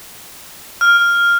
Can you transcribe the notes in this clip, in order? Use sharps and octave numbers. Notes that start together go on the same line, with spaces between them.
F6